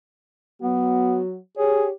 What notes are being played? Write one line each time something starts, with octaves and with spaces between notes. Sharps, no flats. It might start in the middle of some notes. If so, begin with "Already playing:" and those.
F#3 B3 F#4
G4 G#4 C#5